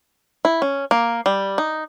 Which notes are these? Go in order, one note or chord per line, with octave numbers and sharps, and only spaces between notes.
E4
C#4
A#3
G3
D#4